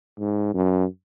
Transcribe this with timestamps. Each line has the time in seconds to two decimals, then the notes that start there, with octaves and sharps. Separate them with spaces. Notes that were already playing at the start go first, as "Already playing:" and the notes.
0.19 G#2
0.54 F#2